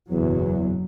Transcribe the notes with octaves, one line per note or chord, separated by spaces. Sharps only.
F#1 E2 B2 F#3